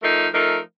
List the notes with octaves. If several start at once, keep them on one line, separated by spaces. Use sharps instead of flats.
F3 A3 D#4 A#4
F3 A3 D#4 A#4